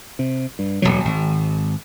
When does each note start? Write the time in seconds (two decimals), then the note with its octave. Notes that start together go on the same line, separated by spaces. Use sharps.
0.19 C3
0.59 G2
0.82 D1 G1 B2 F#3
1.05 G#1